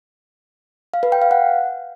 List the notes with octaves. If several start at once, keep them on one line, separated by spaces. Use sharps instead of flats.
F5
B4
G5
F5
F#5